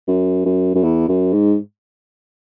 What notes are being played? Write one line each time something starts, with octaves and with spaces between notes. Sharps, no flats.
F#2
F#2
F#2
E2
F#2
G#2